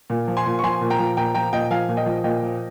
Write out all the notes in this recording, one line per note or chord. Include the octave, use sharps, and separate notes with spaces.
A#2
F3
G#5 C6
A#2
C#6
F3 G#5 C6
A#2
G5 A#5
F3
A#2 G5 A#5
F3 G5 A#5
A#2 D#5 G5
F3 F5 G#5
A#2
D#5 G5
F3
A#2 D#5 G5
F3